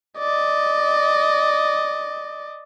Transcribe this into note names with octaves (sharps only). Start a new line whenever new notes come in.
D5 D#5